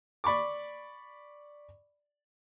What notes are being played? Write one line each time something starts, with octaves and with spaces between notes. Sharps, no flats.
D5 B5 C#6 D6